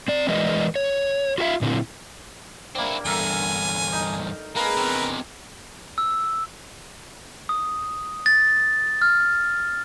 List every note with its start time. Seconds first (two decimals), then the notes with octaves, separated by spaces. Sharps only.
0.08 C4 D5
0.28 E3 G#3 A#4 B4 D5 D#5
0.76 C#5
1.38 F4 F#4 A#4 E5 F5
1.61 A#2 D3 C4 E4
2.75 G2 A#3 C4 E4
3.05 E2 G2 A4 A#4 E5 G#5
3.92 D#4
4.56 G#3 A#3 C#4 A#4 B4
4.77 E2 C3
5.98 E6
7.49 D#6
8.26 A6
9.02 F6